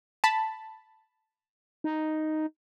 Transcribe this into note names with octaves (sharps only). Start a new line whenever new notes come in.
A5 B5
D#4